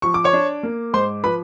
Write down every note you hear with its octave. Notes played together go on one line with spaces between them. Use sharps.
F3 C#6
D6
C#5 C#6
D4
A#3
G#2 C5 C6
F3 B4 B5